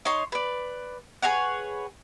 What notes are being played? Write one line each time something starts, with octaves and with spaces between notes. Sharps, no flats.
D#4 C#5 C6
B4 D5
G#4 B4 C#5 F#5